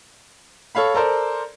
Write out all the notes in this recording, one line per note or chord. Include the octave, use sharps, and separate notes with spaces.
A4 C#5 F5 B5
A4 A#4 C5 D5